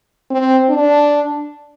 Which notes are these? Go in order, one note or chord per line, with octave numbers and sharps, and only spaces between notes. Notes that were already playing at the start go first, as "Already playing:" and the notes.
C4
D4